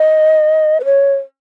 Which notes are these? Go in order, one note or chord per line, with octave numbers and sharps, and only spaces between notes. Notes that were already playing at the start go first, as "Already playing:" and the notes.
Already playing: D#5
B4
C#5